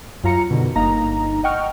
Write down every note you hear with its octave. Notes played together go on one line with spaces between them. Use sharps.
F#2 F4 A#5 C#7
B2 D3 D#3
G1 A#3 D#4 A#5
D#5 F#5 G5 C#6 F6